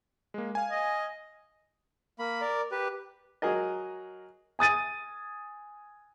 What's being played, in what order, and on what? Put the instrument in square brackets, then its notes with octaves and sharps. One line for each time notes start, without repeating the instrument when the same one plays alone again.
[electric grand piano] G#3 A#3
F5 G#5
[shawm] D#5
[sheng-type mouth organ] A#3 B5
A#4 D5
G4 B4
[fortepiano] F#3 G#4 A#4 D#5
[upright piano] G#5 D#6 A6 D#7